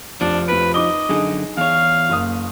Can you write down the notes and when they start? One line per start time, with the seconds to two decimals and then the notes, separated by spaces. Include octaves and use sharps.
0.21 F1 F3 D4
0.48 F1 B4 D7
0.74 D#4 D#5 D6 G7
1.09 F#2 D3 D#4 G#4
1.58 E2 C#5 F5
2.09 F#1 A#3 D#6